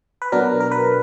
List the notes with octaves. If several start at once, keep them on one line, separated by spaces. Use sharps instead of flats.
B4
B2 F#3 B3 D4 A#4
A#4
B4